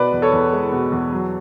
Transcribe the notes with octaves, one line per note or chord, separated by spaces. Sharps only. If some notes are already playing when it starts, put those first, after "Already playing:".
Already playing: B2 B4 D5
E2
A4 C#5
E2
G#3
B2
E2
F#3